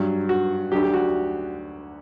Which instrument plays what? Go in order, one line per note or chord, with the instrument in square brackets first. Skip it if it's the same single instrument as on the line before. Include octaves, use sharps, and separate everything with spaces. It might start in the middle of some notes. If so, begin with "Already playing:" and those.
Already playing: [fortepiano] G2 F#3
F#4
D2 D3 F#3 G4
G4
F#4